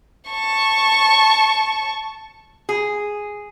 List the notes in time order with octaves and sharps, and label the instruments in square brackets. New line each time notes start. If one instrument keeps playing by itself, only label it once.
[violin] A5 C#6
[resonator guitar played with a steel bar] G#4